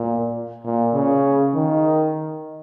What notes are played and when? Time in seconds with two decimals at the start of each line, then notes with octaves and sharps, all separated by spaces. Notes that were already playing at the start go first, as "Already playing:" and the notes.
Already playing: A#2
0.64 A#2
0.94 C#3
1.55 D#3